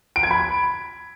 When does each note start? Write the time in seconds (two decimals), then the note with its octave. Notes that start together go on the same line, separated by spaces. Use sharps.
0.16 D7
0.23 G#6
0.31 B5